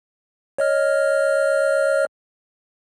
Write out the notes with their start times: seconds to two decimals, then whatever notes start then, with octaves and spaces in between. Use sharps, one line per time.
0.58 C#5 D#5 F6